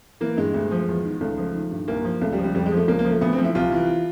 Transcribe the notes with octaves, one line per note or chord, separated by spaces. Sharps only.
E3 A#3
G2 G#3
D2
F3
E2
D#3
C#2 A3
F3
D#3
G2
C2 A#3
F3
C#2 A3
G3
F3
G3
F2 G3
G#3
F3
A3
C#2 A#3
A#3
F3
A3
D2 B3
C4
F3
E4
C2 F4
E3